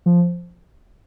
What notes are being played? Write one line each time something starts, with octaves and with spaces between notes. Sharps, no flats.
F3